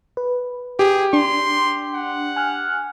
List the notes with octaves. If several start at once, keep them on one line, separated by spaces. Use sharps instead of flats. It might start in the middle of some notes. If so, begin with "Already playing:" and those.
B4
G4 G#4
D4 C6
F#5
G#5 F6 F#6